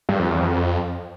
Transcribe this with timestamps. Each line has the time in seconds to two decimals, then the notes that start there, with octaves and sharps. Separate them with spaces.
0.09 G2
0.19 F2
0.30 E2
0.40 F2